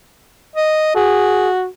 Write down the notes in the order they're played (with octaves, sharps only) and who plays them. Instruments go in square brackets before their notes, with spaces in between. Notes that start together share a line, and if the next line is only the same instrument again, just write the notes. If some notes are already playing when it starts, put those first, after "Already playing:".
[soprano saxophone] D#5
[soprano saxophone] F#4 [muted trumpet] G#4